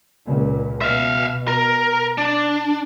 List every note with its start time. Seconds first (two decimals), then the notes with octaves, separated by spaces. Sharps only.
0.24 C#2 A#2
0.81 B2 E5 F5
1.48 A#4
2.18 D4